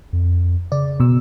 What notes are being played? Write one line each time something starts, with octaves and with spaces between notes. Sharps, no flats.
F2
C#3 D5
B2 E6